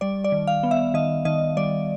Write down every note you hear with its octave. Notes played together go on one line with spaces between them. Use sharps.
G3 D5
D5
D#3
F5
B3
E5
D#3 D#5
D#3 D#5
G3 D5